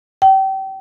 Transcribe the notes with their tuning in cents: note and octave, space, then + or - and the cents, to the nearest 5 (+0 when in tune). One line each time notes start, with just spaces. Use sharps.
G5 -30